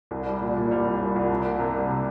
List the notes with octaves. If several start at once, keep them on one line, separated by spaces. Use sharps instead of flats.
C2
G3
A#2
A#2
G3
C2
G3
C2
C3
A#3
C3
G3
C3